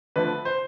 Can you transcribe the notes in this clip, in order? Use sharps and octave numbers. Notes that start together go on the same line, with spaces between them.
D3 F3 A3 B4
C5